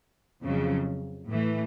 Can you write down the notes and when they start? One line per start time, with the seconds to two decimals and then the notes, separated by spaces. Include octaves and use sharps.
0.43 F2 C#3 F#3
1.29 A2 E3 A3